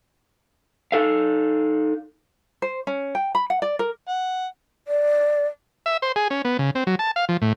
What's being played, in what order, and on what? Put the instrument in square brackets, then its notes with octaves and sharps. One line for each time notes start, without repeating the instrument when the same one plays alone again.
[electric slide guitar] D#4 A4 F5
[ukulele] C5
C#4
G5
B5
F#5
D5
A#4
[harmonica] F#5
[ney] D5
[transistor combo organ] E5
C5
G#4
C#4
B3
C#3
C4
F#3
A5
F5
F3
A2